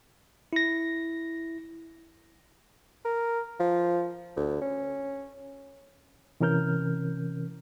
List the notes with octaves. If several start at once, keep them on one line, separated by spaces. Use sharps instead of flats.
E4 A#6
A#4
F3
D2
C#4
C3 E3 C#4 A#4 F6 G6